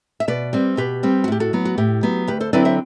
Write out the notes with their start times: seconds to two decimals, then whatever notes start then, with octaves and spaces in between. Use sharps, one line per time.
0.20 E5
0.28 B2 B4 D5
0.53 G3 C4
0.77 B2 G4 B4
1.03 G3 C4
1.24 F#4
1.28 A2 G4
1.40 F#4 A4
1.53 F#3 B3
1.65 F#4
1.78 A2 G4
2.03 F#3 B3
2.27 D2 G4 B4
2.40 A4 C5
2.53 D3 F#3 C4 E4 B4 D5
2.65 C5 E5